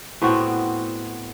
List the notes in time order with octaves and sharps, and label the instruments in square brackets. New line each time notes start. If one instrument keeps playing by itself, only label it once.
[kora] A2 B3 C4 F#4